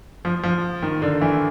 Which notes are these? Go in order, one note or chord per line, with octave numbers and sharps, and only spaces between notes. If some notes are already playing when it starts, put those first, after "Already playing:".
F3
F3
D#3
D3
E3